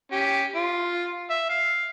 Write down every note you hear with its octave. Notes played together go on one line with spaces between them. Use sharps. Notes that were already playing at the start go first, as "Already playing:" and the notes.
C#4 G4
F4
E5
F5